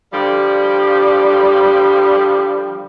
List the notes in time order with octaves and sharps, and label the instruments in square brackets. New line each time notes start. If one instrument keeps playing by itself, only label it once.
[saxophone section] D3 F3 G3